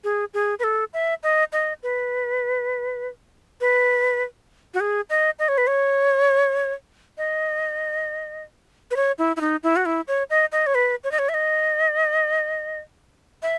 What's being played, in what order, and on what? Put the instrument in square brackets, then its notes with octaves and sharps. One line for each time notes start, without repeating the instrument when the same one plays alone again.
[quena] G#4
G#4
B4
A4
E5
D#5
D#5
B4
B4
F#4
G#4
D#5
D#5
C#5
B4
C#5
D#5
B4
C#5
E4
E4
D#4
E4
F#4
E4
C#5
D#5
D#5
C#5
B4
C#5
D#5
C#5
E5
D#5
E5